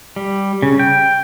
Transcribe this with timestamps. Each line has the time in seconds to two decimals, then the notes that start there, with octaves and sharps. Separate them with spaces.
0.16 G3
0.62 C#3
0.79 G5